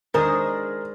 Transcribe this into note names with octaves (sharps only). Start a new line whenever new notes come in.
D#3 G#3 D4 G#4 A#4 C5